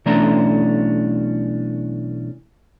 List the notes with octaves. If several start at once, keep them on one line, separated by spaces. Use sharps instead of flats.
B1 E3 A3 C#4 D4 A#5